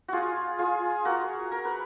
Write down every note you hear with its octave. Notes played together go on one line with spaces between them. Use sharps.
F4 F#4 G#4
F4 G#4
F#4 A#4
A#4
B4